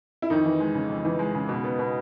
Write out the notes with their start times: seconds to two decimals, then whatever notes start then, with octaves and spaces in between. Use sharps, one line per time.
0.22 E4
0.30 F2 D#3 D#4
0.45 E3
0.60 G#3
0.75 C#3
0.89 F2
1.05 E3
1.19 G#3
1.35 C#3
1.49 B2
1.64 B3
1.79 B2